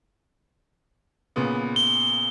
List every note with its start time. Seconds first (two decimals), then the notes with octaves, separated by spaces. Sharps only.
1.36 A#2 C#3 B3
1.76 G7